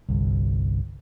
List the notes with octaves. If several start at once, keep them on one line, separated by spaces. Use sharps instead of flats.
G1 C2